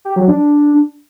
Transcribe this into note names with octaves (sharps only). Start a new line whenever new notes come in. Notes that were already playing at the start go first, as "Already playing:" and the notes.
G4
F#3
D4